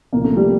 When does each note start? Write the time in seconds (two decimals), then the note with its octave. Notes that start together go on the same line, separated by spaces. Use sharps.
0.13 C2 A#2 F3 A#3
0.24 A3
0.37 G3